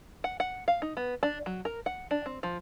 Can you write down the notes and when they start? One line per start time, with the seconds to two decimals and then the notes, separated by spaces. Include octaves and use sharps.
0.24 F#5
0.40 F#5
0.68 F5
0.82 D#4
0.97 B3
1.23 D4
1.46 F#3
1.65 A#4
1.86 F#5
2.11 D4
2.26 C4
2.43 F3